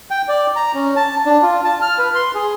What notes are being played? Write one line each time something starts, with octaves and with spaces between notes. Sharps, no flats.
G5
D5
A#5
C#4
A5
D4
F4
A5
F6
B4
C6
G#4